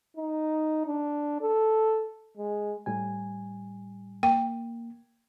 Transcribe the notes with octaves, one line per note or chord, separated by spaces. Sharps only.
D#4
D4
A4
G#3
A2 G3 G#5
A#3 G5